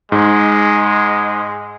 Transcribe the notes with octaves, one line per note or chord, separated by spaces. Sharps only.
G#2 G#3